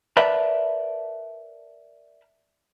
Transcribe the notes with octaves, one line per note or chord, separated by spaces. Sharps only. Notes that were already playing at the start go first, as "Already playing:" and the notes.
A#4 B4 D5 E5 A5 B5